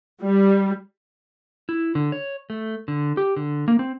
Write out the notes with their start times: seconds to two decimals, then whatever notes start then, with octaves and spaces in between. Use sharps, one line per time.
0.23 G3
1.69 E4
1.95 D3
2.12 C#5
2.50 A3
2.88 D3
3.17 G4
3.36 D3
3.68 A#3
3.79 C4